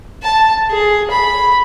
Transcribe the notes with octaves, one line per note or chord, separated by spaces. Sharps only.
A5
G#4
B5